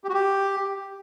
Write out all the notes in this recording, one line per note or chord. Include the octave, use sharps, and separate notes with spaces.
G4
F#4
G4